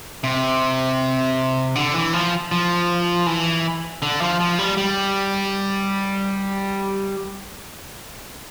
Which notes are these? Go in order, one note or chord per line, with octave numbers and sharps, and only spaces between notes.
C3
D3
E3
F3
F3
E3
D3
F3
F3
G3
G3